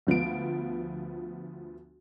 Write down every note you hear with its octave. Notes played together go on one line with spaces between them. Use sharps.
D2 F3 B3 D7